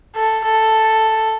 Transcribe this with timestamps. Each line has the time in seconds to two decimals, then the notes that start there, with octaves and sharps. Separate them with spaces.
0.15 A4
0.44 A4